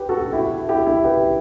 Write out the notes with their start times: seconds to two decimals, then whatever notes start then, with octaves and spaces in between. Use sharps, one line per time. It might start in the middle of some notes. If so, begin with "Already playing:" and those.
Already playing: G4 B4
0.09 F#4 A4
0.33 E4 G4
0.69 E4 G4
0.86 E4 G4
1.04 G4 B4